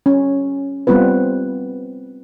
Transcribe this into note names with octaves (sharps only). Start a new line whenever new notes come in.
C#4
G3 B3 C4 F4 B4